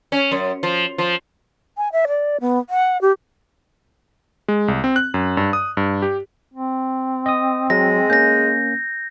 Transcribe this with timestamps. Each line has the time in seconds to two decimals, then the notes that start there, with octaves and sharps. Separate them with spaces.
0.12 C#4
0.32 F#2
0.63 F3
0.98 F3
1.77 G#5
1.92 E5
2.08 D5
2.41 B3
2.70 F#5
3.01 G4
4.48 G#3
4.68 C2
4.84 C4
4.96 F#6
5.14 F#2
5.37 G2
5.53 D#6
5.77 G2
6.02 G4
6.53 C4
7.26 D#5 D#6
7.70 F#3 G#3 A#6
8.10 A#3 C#4 G6 A#6